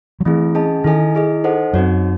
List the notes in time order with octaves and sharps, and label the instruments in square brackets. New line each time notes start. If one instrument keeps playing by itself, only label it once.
[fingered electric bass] F#3
[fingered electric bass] E3 [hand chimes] A3 C4 E4 G#4
[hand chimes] C#4 G#4 D#5 A5
[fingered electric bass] D#3 [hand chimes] E4 A4 D#5 G#5
[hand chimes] E4 G#4 D#5
D#4 A4 C5 D#5 F#5
[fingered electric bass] F#2 [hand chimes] C4 D#4 F#4 C#5